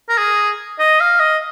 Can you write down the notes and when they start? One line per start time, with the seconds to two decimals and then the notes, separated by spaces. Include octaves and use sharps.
0.09 A#4
0.18 G#4
0.79 D#5
1.00 F5
1.20 D#5